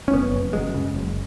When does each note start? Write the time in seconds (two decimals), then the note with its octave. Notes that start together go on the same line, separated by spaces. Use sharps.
0.08 C#4
0.13 F#1 B3
0.34 F#1
0.53 F#2 G#3
0.74 C#3
0.94 F#1